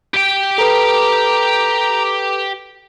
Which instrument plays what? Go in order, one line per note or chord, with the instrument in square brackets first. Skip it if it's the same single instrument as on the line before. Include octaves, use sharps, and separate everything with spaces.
[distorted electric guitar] G4 G5
[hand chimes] A4 B4 [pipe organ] A#5